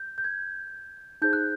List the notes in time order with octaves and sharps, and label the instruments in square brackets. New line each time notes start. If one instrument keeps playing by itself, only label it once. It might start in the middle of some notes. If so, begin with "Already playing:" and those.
Already playing: [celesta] G6
G6
G#6
D#4 G#4 C5 G6
F#6